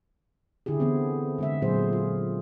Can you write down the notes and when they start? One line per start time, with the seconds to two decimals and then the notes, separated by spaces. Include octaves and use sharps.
0.66 D3 E4 G4 G#4
0.80 E3 B3 C4
1.38 D3 G#3 E5
1.62 A#2 F#3 G#4 C5
1.93 F4